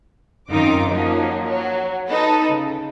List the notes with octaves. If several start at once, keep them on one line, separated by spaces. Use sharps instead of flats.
F#2 D#3 C4 D#4 F4 D6
F3 F#3 A#3 D#4
F#3
D#4 A4 B4
C#3